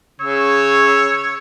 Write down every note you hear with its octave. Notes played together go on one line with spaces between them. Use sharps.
C#3 C#5 E6